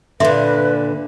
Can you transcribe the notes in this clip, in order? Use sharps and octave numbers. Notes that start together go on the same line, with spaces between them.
A#2 D3 B4 E5 C6